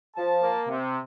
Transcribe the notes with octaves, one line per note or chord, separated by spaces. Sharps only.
F3 A5
A#3
C3